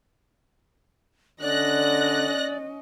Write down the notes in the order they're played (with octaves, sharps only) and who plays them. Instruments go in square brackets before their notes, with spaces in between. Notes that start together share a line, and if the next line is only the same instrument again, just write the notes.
[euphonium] D3 [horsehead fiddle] C#4 D#5 [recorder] D5 [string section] F#6 A#6